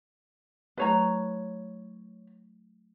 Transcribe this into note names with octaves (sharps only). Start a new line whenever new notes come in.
F#3 A3 E4 B4 C#5 A#5